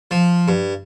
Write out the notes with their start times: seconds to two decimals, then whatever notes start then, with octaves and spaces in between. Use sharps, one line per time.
0.11 F3
0.48 G2